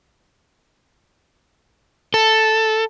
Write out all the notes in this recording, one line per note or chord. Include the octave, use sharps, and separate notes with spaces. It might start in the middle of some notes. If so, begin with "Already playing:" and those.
A4